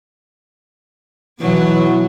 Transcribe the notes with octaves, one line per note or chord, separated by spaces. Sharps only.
B2 E3 F#3 B3